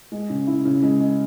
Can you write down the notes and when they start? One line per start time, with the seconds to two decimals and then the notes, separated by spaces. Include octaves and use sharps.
0.12 G#3
0.30 C#3
0.47 E4
0.65 C#3
0.82 G#3
1.00 G#3